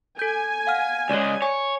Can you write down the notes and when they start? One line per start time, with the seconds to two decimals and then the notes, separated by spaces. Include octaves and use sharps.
0.19 A4 G#5 G6
0.67 F5 F#5 F6
1.09 C#2 G#3 C#5 D5
1.42 C#5 G#5